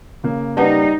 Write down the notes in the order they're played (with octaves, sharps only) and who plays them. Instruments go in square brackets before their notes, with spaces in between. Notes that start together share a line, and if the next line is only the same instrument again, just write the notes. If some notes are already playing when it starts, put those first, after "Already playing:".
[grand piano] C#3 A#3
[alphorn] G3 [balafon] C#4 B4 F#5 [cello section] D#4